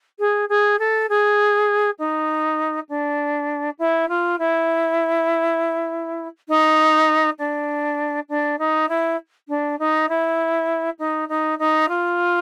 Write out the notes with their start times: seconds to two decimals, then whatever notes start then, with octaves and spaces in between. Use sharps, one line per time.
0.19 G#4
0.49 G#4
0.79 A4
1.09 G#4
1.99 D#4
2.89 D4
3.78 E4
4.09 F4
4.38 E4
6.49 D#4
7.39 D4
8.29 D4
8.59 D#4
8.89 E4
9.48 D4
9.79 D#4
10.09 E4
10.99 D#4
11.28 D#4
11.59 D#4
11.89 F4